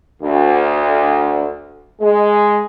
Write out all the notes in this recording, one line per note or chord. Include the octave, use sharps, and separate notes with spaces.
D2
G#3